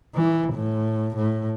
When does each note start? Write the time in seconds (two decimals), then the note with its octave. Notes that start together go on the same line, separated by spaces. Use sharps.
0.15 E3
0.54 A2
1.16 A2